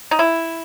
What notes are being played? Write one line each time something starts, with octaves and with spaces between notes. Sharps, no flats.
D#4
E4